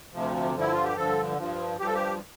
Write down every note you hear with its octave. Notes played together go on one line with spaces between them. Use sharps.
D2 C3 F3
G2 D3 F3 E4
F4
G4
G2 D3 F3 A4
G2 F3
G2 F3 G4
A4
G4